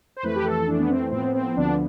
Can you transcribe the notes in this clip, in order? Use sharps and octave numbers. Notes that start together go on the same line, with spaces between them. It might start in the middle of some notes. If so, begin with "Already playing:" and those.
C5
F2 E3 A3 B4
G4
A4
F2 E3 A3 D4
B3
C4
A2 F3 B3 C4
C4
D2 D3 F3 B3 D4